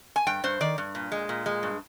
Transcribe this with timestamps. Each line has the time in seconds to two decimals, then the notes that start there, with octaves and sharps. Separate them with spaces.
0.16 G#5
0.27 G2 G5
0.44 G2 C5
0.61 D#3 D5
0.78 G2
0.95 A#2
1.12 G#3
1.29 A#2
1.46 G#3
1.63 G2